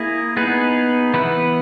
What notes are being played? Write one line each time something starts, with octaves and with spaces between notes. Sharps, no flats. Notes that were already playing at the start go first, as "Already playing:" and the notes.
Already playing: A#3 E4 G#4
B3 D#4 G#4 B4
E3 B3 E4 B4